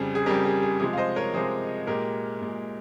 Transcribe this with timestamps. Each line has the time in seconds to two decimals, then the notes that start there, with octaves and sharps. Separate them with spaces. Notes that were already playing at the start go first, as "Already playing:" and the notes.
Already playing: F2 C#3 G3 G#4 C5
0.15 G#4
0.26 F2 C#3 G3 G4 A#4
0.45 G#4
0.63 G#4
0.80 C3 F3 G#3 G#4
0.93 F5
0.98 C5 D#5
1.16 A#4 C#5
1.34 C3 F3 G#3 G#4 C5
1.87 A#2 G#3 G4 A#4
2.41 A#2 G#3